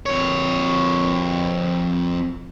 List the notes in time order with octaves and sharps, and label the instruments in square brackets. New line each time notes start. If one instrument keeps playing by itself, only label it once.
[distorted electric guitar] F2 C#5